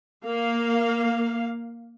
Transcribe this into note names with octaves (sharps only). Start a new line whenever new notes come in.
A#3 F5